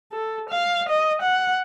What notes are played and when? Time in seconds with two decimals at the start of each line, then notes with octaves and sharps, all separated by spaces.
0.12 A4
0.50 F5
0.89 D#5
1.22 F#5